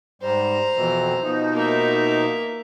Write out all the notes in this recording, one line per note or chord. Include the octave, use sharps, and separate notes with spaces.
G#2 G3 C5 A#5
F2 B2 E3
B2 F3 D#4
A#3 E5